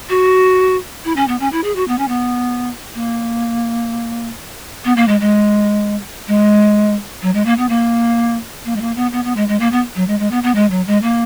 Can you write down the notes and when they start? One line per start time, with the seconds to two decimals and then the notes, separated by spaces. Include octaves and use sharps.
0.09 F#4
1.05 E4
1.17 C#4
1.28 B3
1.40 C#4
1.52 E4
1.64 G#4
1.76 F#4
1.88 B3
1.99 C#4
2.08 B3
2.95 A#3
4.85 B3
4.97 A#3
5.08 G#3
5.21 G#3
6.28 G#3
7.22 F#3
7.34 G#3
7.46 A#3
7.58 B3
7.69 A#3
8.65 A#3
8.76 G#3
8.81 A#3
8.96 B3
9.13 B3
9.25 B3
9.37 G#3
9.48 G#3
9.60 A#3
9.72 B3
9.96 F#3
10.08 G#3
10.20 G#3
10.31 B3
10.43 B3
10.55 G#3
10.70 F#3
10.87 G#3
11.03 A#3